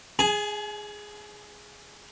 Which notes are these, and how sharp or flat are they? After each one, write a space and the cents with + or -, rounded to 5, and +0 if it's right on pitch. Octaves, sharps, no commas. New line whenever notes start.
G#4 +0 G#5 +40